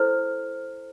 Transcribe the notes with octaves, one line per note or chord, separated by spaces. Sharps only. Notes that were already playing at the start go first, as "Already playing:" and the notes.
Already playing: E4 A4 C5 F6